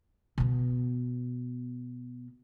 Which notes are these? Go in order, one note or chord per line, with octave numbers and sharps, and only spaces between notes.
B2 B3